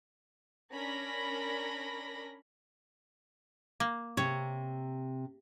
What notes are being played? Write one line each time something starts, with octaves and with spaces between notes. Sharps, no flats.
C#4 D4 A#4 B5 A#6
A#3
C3 C#5